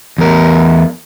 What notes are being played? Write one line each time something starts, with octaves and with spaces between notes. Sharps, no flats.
E2 A#4